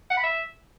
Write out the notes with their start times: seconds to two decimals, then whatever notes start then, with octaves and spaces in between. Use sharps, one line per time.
0.10 F#5
0.17 B5
0.23 E5